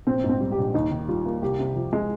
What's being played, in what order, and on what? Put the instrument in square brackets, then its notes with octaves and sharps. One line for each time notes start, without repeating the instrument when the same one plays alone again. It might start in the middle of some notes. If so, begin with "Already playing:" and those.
[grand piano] A#1 [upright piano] C4
[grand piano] G#2
[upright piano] C4
[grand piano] G3
[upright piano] G4
[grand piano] A#1
[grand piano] D#2 [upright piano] D#4
[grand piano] D#3
[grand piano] G3 [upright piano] F4
[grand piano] A#3
[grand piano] C2 [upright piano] G4
[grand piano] C3
F3
G#3